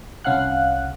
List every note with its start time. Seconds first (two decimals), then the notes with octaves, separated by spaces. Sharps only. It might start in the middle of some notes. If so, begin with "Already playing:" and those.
0.24 C2 C#4 F5 F#5 F#6